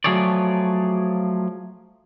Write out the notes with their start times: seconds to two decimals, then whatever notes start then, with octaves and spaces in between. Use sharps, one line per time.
0.04 F3 F#3 A3 G#4 C#5 D5